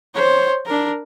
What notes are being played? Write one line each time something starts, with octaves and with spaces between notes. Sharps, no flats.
C5 C#5
D4 A#4